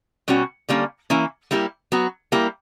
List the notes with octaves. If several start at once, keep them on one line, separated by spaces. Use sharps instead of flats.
B2 G3 C#4 F#4
D3 G3 A#3 C#4
E3 A#3 C#4 E4
G3 A#3 E4 G4
F#3 B3 F#4
G3 A#3 E4 G4